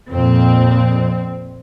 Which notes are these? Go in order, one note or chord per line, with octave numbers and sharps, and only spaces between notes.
F2 A#2 C4